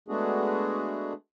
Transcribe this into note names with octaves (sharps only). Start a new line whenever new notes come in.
G#3 A3 B3 D4 F#4 G#4